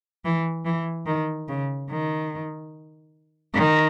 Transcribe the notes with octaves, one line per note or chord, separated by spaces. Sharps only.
E3
E3
D#3
C#3
D#3
D#3